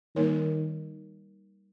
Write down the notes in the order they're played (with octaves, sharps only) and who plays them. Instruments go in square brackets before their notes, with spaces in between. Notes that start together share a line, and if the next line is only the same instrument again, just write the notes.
[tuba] D#3 [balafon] G3 A#3 D#4 A#4 C#5